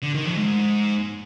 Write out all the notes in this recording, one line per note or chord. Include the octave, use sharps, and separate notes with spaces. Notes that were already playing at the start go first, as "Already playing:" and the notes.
D3
D#3
F2
G#2